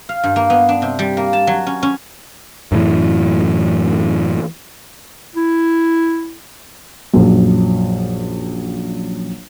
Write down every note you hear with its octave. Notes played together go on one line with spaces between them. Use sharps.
F5
G2
A#3
B3
D4
C3
G3
A#3
A5
F#3
C#4
C#4
F#2 A2 E3
E4
A#1 F#2